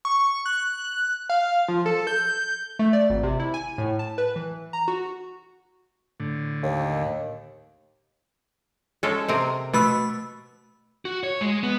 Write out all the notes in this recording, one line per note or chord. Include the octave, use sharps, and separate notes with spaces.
C#6
F#6
F5
F3
A4
G6
A3
D5
G#1
C3
E4
G#5
A2
A5
B4
E3
A#5
F#4
A2 D3
D#2
G#3 C#4 A4
C3 C4 A#4
B2 A3 B3 B5 E6
F#4
C#5
G#3
B3